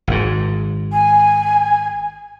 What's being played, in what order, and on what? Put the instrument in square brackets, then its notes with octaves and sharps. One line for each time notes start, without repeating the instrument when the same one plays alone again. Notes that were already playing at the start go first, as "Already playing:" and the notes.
[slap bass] G#1 G#2
[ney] G#5